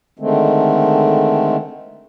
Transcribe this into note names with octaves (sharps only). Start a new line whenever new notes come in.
D3 D#3 G#3 A3 C4